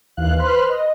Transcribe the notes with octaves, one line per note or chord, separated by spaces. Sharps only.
D#2 E3 F5 F#6
B4 C5 B5 C6 F6 F#6
D#5